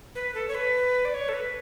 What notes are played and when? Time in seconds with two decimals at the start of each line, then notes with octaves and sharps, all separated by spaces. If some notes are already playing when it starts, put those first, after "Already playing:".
0.15 B4
0.35 A4
0.48 C#5
0.55 B4
1.05 D5
1.14 C#5
1.29 A4
1.34 B4